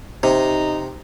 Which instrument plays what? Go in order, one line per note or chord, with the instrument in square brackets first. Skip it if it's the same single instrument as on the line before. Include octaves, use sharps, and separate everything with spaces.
[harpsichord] C3 [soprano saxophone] D#4